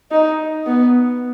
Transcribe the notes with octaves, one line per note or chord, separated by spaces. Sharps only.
D#4
B3